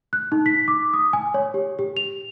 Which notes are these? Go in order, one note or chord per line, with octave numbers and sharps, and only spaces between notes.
F#6
D#4
B6
D6
D#6
G#5
C#5
G4
G4
F7